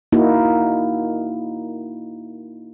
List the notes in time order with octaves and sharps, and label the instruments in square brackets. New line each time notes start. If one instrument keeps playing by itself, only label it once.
[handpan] A#3 D#4 E4 F#4